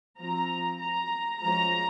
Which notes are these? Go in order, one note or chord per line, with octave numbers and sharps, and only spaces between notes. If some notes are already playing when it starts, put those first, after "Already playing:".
F3 C4 A#5
A#5
F3 G#3 C#4 A#5